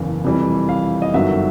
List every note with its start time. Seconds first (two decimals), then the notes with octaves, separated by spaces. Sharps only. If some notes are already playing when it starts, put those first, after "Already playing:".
Already playing: F#1 E2 C#3 E3 F5
0.24 F2 C3 E3 G3
0.69 F5
1.02 D#5
1.13 G1 F#2 D#3 F#3 E5